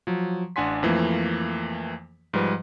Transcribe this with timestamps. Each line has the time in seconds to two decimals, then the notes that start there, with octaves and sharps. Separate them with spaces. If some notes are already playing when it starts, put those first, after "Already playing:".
0.07 F3 F#3
0.56 A1 D4 F#5 G#5 C6 B6
0.83 F2 E3 F3 A3 A#3
2.33 G#2 F3 G3 B4